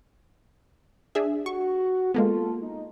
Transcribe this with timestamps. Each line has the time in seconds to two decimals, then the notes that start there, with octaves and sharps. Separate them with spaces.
1.15 D4 G#4 E5
1.46 F#4 C#6
2.14 G#3 A#3 B3 F4 A4
2.61 D#4